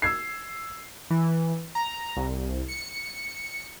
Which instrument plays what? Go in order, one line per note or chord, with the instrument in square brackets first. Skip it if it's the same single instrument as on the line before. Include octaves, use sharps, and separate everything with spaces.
[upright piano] E6 G#6 C7
[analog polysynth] E3
A#5
C2
C#7